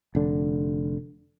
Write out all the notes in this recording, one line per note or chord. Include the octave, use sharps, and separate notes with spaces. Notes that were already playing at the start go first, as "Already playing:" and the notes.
F1 D3